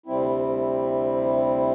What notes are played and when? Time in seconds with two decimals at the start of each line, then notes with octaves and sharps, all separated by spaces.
0.06 D2 C3 G3 C4 E4